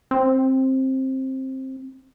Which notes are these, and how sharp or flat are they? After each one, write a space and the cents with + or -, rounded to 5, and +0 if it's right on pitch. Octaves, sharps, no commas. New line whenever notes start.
C4 +15